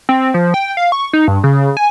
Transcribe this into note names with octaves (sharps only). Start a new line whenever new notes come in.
C4
F3
G5
F5
C#6
D#4
G2
C#3
G#5